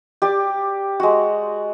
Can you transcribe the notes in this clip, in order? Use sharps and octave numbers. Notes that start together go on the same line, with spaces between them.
G4 D5 D6
G#3 F#4